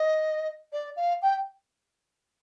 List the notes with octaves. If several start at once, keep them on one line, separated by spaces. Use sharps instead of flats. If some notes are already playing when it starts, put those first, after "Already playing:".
Already playing: D#5
D5
F5
G5